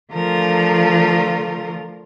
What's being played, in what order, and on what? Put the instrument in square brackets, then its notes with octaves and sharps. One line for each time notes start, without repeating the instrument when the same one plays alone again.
[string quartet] D3 F3 A3 F4 A#4